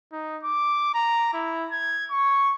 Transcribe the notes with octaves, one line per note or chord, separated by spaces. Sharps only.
D#4
D6
A#5
E4
G#6
C#6